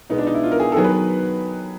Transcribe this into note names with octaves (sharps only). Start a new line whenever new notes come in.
B2 G#3 B3 D#4
D4
D#4
E4
F4
A#4
G#4
A4
D#3 F#3 B3 G#4
B4